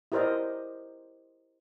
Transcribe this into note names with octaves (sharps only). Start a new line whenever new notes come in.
E4 G4 A#4 C5 D5 D#5